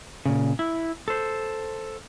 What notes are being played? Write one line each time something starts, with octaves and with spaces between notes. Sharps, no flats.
A#2 C#3
E4
A4 C5